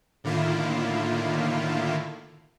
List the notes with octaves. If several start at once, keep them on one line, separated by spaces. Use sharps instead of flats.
A2 D3 D#3 A#3 E4 F4